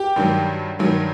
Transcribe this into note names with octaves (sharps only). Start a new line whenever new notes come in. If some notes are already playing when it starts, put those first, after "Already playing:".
Already playing: G4
G2 D#3 F#3
G2 D#3 F#3